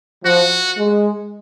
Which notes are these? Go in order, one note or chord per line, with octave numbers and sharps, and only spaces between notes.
F3 F#4
G#3